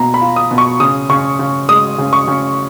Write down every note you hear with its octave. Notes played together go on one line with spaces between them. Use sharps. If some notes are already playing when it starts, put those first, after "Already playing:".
Already playing: B2 A#3 A#5
B5
F4
D#6
B2
C#6
C#3 D#6
C#3 C#6
C#3
G#3 D#6
C#3
C#6
C#3